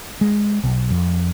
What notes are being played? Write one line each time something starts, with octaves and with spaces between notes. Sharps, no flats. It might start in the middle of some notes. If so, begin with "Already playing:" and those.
G#3
B1
F2